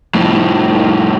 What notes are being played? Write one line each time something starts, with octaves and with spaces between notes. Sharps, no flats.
F2 A2